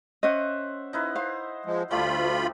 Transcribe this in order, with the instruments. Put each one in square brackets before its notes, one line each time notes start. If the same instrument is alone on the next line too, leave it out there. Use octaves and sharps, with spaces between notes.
[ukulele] C#4 D#5 [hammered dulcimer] C5 E5 F#5
[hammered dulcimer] D#4 E4 B4
[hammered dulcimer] C5 [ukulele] F5
[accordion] F3 G#3
[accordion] D2 F4 B5 [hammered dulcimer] F3 G3 A3